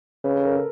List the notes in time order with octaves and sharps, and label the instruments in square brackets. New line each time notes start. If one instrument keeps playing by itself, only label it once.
[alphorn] C#3 [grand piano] B4
[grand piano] A4
A#4
A4